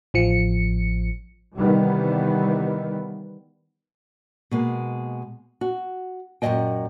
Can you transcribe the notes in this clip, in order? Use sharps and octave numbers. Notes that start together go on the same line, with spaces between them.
A1 F3 C#7
C3 D#3 E3 G3 B3
B2 G#3 A#3
F#4
F#2 A#2 F#3 G#3 D#5 G5